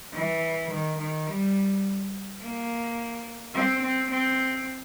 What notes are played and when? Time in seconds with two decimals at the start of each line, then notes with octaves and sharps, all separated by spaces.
0.13 E3
0.70 D#3
0.98 D#3
1.27 G3
2.40 A#3
3.54 C4
3.82 C4
4.10 C4